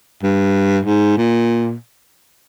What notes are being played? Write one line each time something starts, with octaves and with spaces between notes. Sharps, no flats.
G2
G#2
A#2